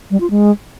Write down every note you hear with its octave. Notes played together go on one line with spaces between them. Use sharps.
G3
F4
G#3